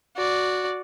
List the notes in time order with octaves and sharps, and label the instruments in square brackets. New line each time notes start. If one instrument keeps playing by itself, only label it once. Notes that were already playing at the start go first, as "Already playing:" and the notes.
[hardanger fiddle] F#4 D5